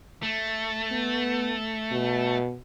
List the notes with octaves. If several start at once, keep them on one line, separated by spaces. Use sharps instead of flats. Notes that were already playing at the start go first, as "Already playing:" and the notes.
A3
B3
B2